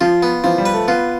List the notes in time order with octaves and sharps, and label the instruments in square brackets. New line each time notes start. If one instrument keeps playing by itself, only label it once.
[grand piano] F3 [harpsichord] F4
[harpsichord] B3
[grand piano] E3 [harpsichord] F3
[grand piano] G3
[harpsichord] B4
[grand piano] A3
[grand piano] B3 [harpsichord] F4